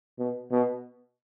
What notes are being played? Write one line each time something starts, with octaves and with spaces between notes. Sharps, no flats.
B2
B2